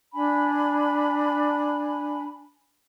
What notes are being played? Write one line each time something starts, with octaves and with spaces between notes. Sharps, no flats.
D4 G#5 B5